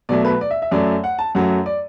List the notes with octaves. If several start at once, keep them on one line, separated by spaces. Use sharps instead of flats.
B2 F#3 A3 D5
B4
D5
E5
E5
F#2 F#3 A3 D5
F#5
A5
F#2 F#3 A3 F#5
D5